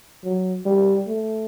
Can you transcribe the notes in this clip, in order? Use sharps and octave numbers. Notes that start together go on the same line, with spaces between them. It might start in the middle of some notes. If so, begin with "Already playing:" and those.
F#3
G3
A3